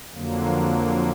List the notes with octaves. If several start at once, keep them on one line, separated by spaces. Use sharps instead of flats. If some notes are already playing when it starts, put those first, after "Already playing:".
F2 D3 F#3 A#3